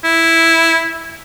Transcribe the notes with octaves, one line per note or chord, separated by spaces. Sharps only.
E4